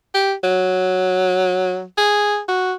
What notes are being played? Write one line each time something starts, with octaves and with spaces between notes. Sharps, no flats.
G4
F#3
G#4
F#4